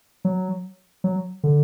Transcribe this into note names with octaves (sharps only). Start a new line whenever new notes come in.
F#3
F#3
D3